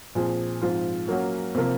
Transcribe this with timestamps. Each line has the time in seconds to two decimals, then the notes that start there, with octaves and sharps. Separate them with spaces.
0.15 A#2 F3 C4 F4 G#4
0.62 G#2 F3 C4 F4
1.08 F#3 A#3 C#4 F#4
1.55 C3 F3 A#3 F4 A#4